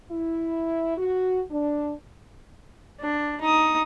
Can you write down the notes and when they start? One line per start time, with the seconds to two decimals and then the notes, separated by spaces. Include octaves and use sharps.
0.10 E4
0.98 F#4
1.51 D4
3.00 D4
3.41 D#4 D#6